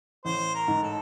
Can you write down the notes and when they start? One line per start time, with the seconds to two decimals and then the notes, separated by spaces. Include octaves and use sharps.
0.25 A1 C5
0.54 A#4
0.68 G#2
0.83 A4